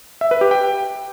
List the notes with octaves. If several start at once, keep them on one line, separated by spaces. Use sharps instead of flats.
E5
B4
G4
G5